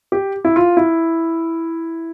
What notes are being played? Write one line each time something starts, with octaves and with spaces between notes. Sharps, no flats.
G4
E4
F4
E4